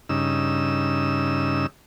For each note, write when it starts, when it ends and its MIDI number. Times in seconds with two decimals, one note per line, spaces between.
0.09 1.67 43
0.09 1.67 49
0.09 1.67 63
0.09 1.67 88